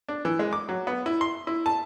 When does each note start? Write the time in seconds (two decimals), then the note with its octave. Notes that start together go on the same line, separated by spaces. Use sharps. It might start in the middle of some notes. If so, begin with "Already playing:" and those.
0.09 D4
0.25 E3
0.39 G#3
0.53 D6
0.69 F#3
0.87 B3
1.06 E4
1.21 C6
1.47 E4
1.66 A5